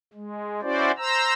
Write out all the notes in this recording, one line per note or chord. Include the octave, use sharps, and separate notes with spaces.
G#3
C#4 E4 F#4 C5 D5
C5 A#5 E6